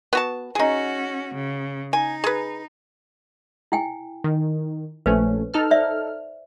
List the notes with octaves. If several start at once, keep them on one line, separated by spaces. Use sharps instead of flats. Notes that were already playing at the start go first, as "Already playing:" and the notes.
B3 F#4 A5
C#4 D#4 F#4 G#4
C#3
D#4 G#5
G#4 B4
E4 G5 G#5
D#3
A#1 A3 C#4 B4 C5
D#4 A4 F6
C5 D5 E5